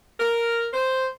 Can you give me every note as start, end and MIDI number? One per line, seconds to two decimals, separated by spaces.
0.20 0.67 70
0.73 1.07 72